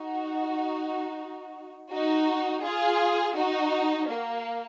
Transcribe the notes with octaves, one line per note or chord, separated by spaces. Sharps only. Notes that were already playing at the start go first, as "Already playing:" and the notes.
Already playing: D#4 F#4
D#4 F#4
F4 G#4
D#4 F#4
A#3